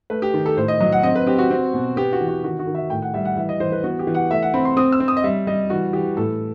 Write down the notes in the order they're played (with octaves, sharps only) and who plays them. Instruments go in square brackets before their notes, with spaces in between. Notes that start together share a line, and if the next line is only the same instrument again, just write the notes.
[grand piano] A3 B4
G4
D#3
A4
A2 C5
D#5
F#3 D#5
F#5
C4 D#5
B4
C4 G4
F#4
C4
B2
B3 G4
F#4
E3
F#4
D#3 F#4
F#4
D#3
E5
A2 G5
F#5
G3 E5
F#5
E3 E5
D#5
E3 C5
B4
B3 F#4
G4
E3
F#5
A3 E5
F#5
C4 B5
C6
C4 D#6
E6
C4
D#6
D#5
G3 E5
G3 D#5
E3 F#4
E3 G4
A2 A4